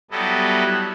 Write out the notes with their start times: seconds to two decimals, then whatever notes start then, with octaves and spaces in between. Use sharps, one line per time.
0.11 F#3 G3 B3 E4 A4 D#5